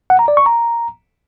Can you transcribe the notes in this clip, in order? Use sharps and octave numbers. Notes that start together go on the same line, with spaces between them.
F#5
A#5
D5
C#6
A#5